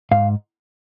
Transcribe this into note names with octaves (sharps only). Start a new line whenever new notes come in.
G#2 F5